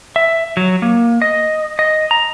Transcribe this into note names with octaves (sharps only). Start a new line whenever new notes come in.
E5
F#3
A#3
D#5
D#5
A#5